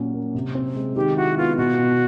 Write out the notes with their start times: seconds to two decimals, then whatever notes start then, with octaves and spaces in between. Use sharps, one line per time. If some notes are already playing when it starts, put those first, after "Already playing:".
Already playing: A#2 F#3 C#4
0.14 A#3
0.35 C3
0.55 C4
0.75 G#3
0.96 D#3 G4
1.17 E4 F#4
1.37 B3 F4
1.57 B2 F#4
1.78 B2